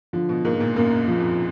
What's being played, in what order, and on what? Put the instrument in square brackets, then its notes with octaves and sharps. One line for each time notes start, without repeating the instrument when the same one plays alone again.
[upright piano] D3 [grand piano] F3
[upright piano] B2
[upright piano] G#2 [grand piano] A#3
[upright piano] A#2
[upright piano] F#2 [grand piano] A#3
[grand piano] F3
[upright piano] F2